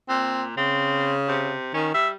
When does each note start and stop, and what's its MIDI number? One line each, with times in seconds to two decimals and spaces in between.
0.09 0.56 46
0.09 0.44 60
0.57 1.54 49
0.57 1.13 60
1.28 1.73 48
1.74 1.94 51
1.74 1.89 61
1.94 2.15 55
1.94 2.09 76